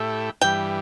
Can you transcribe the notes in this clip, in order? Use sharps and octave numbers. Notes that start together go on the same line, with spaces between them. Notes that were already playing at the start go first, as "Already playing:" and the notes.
Already playing: A2 A3 E4 G4
G2 E3 G3 G5